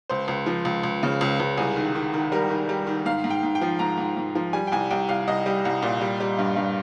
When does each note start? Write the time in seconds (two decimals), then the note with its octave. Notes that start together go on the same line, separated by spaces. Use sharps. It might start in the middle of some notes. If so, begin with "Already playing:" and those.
0.10 C#2 C5
0.28 C#2
0.46 F3
0.65 C#2
0.83 C#2
1.03 C#3
1.21 C#2
1.40 C#2
1.57 C2 G#4
1.76 D#3
1.95 D#3
2.14 D#3
2.32 G3 A#4
2.50 D#3
2.69 G3
2.87 D#3
3.06 G#2 F5
3.24 G#2
3.30 G5
3.43 G#2
3.55 G5
3.62 F3
3.79 G#2 A#5
3.98 G#2
4.17 G#2
4.35 F3
4.53 G3 G#5
4.67 G5
4.72 C2 G#5
4.91 C2 G5
5.09 C2 F5
5.28 C2 D#5
5.46 G3
5.65 C2
5.83 A#2
6.01 G3
6.20 G3
6.39 G2
6.56 G2